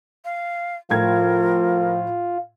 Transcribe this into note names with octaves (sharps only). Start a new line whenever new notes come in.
F5
A2 F3 F4 A#4 G#6